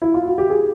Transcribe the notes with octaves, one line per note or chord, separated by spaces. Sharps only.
E4
F4
F#4
G4
G#4